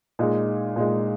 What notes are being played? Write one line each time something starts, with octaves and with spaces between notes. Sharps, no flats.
A#2 G#3 D#4
A#2 G#3 D#4